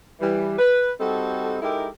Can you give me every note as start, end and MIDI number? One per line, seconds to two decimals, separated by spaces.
0.20 0.54 52
0.20 0.54 55
0.59 0.91 71
1.00 1.57 55
1.00 1.57 60
1.00 1.57 63
1.00 1.57 66
1.00 1.57 69
1.62 1.87 56
1.62 1.87 63
1.62 1.87 64
1.62 1.87 67
1.62 1.87 69
1.62 1.87 70